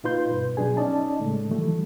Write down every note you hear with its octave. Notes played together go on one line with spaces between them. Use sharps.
A#2 D#4 F4 B4 C6 G6
G2 B2 B4
B2 F#3 D4 G#4 G#5
C#4 D#4 D5 D#5 A5
A2 C#3 G#3 A3
D#3 E3 F#3 G3 A3